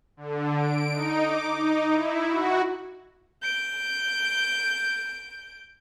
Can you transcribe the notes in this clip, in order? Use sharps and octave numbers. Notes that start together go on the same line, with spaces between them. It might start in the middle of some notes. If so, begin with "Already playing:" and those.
D3
D7
D#4
D6
D#4
E4
F#4
G6 D7